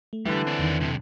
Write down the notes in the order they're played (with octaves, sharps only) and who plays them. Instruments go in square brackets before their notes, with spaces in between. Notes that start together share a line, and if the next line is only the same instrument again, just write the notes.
[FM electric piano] A3
[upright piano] D3 E3 [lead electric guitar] G3
[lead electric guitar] C4 D4
[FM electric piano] E2 D#3
[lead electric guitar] B1 C3